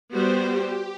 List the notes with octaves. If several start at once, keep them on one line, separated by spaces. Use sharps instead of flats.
G3 B3 F#4 G4 C5